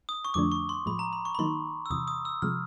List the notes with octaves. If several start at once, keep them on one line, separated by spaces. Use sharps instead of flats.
D#6
C#6
F2 D3 F3 A3 D4 D6
C#6
C6
A2 F3 G#3 B5
A#5
B5
C#6
B5
D#3 F#3 A#3 D#4 C6
E6
E2 C3 E3 D#6
D#6
E6
C3 F3 G#3 F6